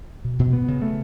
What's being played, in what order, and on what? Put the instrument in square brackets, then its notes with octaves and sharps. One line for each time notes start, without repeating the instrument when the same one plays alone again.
[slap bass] B2
B2
B3
C#3
A3